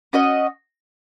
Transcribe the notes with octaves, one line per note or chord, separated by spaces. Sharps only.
C#4 F#4 D#5